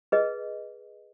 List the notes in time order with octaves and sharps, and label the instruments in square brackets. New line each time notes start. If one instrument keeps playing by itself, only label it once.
[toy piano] G#4 B4 D#5